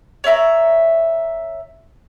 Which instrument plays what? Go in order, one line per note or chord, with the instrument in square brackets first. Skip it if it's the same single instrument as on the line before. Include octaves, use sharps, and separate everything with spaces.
[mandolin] C#5 D5 E5 A#5